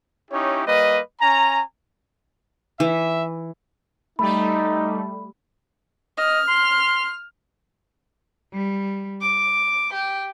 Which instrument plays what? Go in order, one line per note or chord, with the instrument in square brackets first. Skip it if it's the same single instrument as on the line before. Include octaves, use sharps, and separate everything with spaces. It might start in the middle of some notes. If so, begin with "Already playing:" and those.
[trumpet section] C#4 D#4 E4 G4 C#5
G3 A#3 B4 D#5
C#4 G#5 A#5
[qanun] E3 [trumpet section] E5
[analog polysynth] G3 A3 [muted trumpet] D#4 [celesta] B5
[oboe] D#5 [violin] F6
[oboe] C6
[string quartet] G3
D6
G4